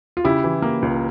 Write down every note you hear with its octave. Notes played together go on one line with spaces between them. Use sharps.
F4
C#3 E4 G4
E3
A#3
C#2